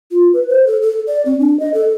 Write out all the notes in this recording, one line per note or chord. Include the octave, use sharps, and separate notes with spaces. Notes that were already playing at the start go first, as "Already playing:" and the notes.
F4
B4
C5
A4
A4
D5
C4
D4
D#5
A4